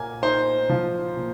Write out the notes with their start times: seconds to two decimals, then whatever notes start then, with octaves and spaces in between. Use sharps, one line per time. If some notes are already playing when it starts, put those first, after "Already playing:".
Already playing: A#2 A#3 G#5
0.22 D#4 C5
0.70 F3
1.17 A#2